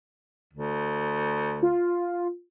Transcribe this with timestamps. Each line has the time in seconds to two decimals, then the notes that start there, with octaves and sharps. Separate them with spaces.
0.53 D2
1.63 F4